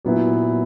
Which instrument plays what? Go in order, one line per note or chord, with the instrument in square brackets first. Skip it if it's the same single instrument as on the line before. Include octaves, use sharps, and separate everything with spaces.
[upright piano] A#2 F#3 B3 E4